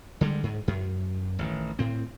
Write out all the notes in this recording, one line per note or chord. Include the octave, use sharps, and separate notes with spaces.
D3 G3 G#3
G#2
F#2
A1 D3 D#3
A2 C4